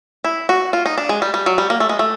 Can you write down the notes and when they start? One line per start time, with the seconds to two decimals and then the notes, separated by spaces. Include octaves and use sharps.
0.24 E4
0.49 F#4
0.73 F4
0.86 D#4
0.98 D4
1.09 G#3
1.22 G3
1.34 G3
1.46 F#3
1.58 G3
1.70 A#3
1.80 A3
1.89 G#3
1.99 A3